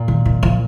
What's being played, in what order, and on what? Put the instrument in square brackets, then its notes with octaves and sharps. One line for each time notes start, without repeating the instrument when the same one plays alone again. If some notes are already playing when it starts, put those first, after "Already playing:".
Already playing: [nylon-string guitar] A#2
[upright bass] D#3
D#3
F3